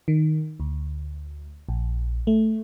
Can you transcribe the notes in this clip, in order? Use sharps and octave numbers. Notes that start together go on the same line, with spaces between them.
D#3
D2
A#1
A3